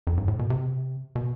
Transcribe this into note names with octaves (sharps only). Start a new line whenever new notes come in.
F2
G#2
A2
B2
C3
B2